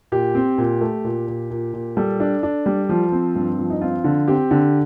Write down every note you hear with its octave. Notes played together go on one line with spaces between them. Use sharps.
A#2 G4
C4
A#2
A3
A#2
A#2
A#2
A#2
G3 A4
D4
D4
G3
F3
C4
G2
F3
D#4
C4 F4
D3
C4 G4
D3